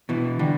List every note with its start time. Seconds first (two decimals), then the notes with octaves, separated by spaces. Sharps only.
0.09 B2 E3
0.39 D3 G3